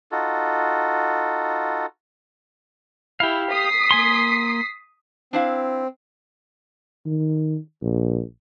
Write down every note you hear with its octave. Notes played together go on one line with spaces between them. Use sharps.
D#4 F4 F#4 A4
E4 G4 F5
D#6 B6 C7
A#3 G#5 C6
C4 D4 E4 F5
D#3
A#1